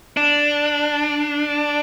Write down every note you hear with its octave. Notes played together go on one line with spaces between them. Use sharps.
D4